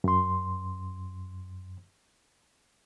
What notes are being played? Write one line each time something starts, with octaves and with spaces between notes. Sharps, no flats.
F#2 C6